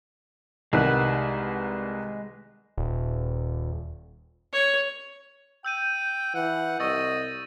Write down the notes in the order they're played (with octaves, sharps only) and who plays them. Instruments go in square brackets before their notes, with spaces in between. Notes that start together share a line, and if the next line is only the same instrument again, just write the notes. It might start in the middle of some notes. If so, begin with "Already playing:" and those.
[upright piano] C2 D#3 [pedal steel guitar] G#3 B4 F#5
[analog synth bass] D#1
[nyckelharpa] C#5
[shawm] G5 [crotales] E6 G6 D#7
[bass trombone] E3 [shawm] F#5
[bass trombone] C2 [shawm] D#5 [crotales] C#6 E6 A6